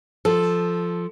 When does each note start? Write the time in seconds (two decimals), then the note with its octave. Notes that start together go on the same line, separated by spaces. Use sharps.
0.25 F3 A4